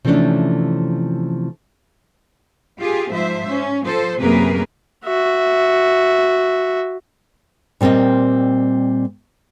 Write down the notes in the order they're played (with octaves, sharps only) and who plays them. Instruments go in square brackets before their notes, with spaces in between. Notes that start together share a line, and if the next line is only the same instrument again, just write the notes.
[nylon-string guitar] C3 E3 F3 A3 C#4 D4
[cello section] F4 G4 G#4
G#2 F3 C5 E5
C#4
F3 A4 C5
F#2 C3 A#3 G#4 A#4 B4
[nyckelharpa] F#4 E5
[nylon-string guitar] A#2 G3 C4 A#4 D#5